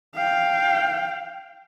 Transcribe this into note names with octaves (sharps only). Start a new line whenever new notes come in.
F5 G5